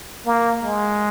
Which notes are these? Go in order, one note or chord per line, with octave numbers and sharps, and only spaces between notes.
A#3
G#3